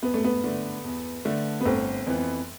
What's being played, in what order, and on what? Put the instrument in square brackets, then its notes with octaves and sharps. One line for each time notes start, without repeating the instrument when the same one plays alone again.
[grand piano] E2 [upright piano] B3
[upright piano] A3
B3
[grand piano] D3 A3
E2
D3 A3
[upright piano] B3
[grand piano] G1 [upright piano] A3 C4
[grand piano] F2 E3 B3